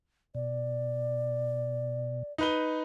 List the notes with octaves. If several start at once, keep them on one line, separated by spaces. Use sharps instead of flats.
B2 D5
D#4 B4 G7